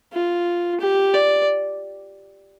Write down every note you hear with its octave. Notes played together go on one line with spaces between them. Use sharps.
F4
G4
D5